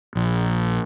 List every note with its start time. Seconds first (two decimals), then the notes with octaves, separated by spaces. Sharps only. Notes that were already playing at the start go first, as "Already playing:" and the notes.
0.15 A#1